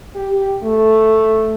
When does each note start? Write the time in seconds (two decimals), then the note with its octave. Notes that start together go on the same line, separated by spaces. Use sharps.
0.16 G4
0.63 A3